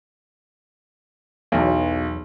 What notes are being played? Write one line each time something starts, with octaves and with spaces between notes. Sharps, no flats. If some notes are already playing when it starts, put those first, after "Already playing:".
B1 E2 F#3